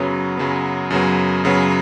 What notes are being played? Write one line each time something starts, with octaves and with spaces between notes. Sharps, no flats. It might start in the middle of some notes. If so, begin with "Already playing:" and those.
Already playing: F#2 C#3 F#3 B3
F#2 C#3 F#3 B3
F#2 C#3 F#3 B3
F#2 C#3 F#3 B3